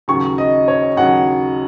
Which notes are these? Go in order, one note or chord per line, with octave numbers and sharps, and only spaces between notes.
D#2 C#3 F#3 C#6
D#5
C#5
D#2 C#3 F#3 F#5